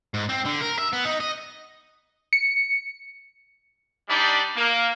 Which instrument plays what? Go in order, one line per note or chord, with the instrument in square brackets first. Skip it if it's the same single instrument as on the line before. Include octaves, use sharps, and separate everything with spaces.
[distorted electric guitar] G#2
C4
D3
A#4
E5
B3
D#4
D#5
[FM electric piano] C#7
[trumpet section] G3 D4 D#4 D5 B5
A#3